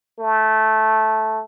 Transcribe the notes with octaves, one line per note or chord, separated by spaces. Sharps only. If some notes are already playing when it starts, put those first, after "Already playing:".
A3